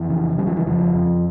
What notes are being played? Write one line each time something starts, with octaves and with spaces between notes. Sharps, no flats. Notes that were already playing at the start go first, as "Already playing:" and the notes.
Already playing: F2 E3
C#3
C#3 G3
F3
E3
F2 F3
F2